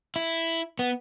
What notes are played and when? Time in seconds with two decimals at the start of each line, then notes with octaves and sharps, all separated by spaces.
0.16 E4
0.79 B3